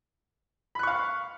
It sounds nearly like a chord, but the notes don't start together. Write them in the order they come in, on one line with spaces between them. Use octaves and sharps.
B5 F#6 C#6 F5